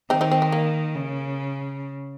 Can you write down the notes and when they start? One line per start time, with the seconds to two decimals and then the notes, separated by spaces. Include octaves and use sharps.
0.10 D#3 C4 D#4
0.21 C4 D#4
0.31 C4
0.42 C4
0.52 A#3
0.95 C#3